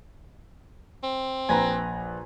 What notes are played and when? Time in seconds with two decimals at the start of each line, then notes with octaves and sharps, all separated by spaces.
1.03 C4
1.49 A#1 B4 G#5 A#5 A#6